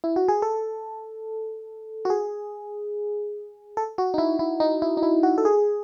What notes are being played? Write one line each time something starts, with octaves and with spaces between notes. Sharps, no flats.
E4
F#4
G#4
A4
F#4
G#4
A4
F#4
D#4
E4
E4
D#4
E4
D#4
E4
F#4
A4
G#4